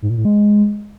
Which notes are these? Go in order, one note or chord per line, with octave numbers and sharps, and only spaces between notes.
G#2
A#2
A2
G#3